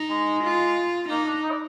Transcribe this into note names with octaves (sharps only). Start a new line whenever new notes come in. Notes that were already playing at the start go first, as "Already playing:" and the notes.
Already playing: D#4
G#3
F4
A#3 D#4
D4
D#4
D5